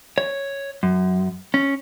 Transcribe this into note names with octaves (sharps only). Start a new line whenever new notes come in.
C#5
F#2
C#4